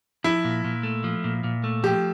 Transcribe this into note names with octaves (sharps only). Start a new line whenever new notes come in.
F3 E4
A#2
A#2
A3
F3
A#2
A#2
A3
F3 G4